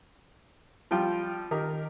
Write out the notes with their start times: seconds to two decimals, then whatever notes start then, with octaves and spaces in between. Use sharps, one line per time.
0.91 F3 G3 F4 G5
1.51 D#3 G4 A#4